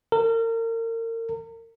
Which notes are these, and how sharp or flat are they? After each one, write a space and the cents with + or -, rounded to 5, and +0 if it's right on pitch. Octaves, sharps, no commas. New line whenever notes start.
A#4 -35